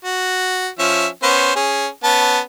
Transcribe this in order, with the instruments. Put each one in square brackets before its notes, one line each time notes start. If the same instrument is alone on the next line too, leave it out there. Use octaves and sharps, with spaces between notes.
[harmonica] F#4
F3 C#4 E5
B3 C#4 C5
C#4 G#4
B3 C#4 A5